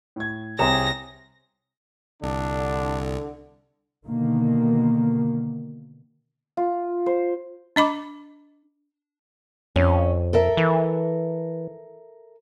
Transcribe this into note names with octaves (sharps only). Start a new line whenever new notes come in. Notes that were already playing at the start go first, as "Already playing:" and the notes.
A2 G#6
C2 C4 G#4 C#5 A#5 A#6 E7
C2 D3 D4
B2 D3 D#3 A#3
F4
C5
D4 D#5 B5 D6
F2 C#4
A4 A#4 E5
E3